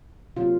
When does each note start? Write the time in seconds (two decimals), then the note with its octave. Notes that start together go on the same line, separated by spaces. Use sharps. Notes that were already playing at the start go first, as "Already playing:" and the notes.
0.36 C3 F#3 A#3 F4